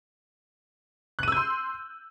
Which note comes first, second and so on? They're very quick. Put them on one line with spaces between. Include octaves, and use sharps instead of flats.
F#6 D#7 E6 G6 C6